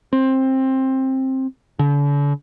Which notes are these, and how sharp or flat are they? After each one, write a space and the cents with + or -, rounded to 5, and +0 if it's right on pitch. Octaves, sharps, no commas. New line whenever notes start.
C4 +15
D3 -40